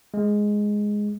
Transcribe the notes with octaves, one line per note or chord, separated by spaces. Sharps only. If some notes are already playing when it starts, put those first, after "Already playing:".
G#3